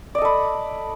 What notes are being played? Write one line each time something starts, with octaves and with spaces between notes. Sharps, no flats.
A4 D5 D#5 B5